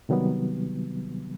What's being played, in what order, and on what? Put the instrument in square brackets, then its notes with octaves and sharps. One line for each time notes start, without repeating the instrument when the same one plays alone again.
[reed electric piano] C3 D#3 F#3 G3 B3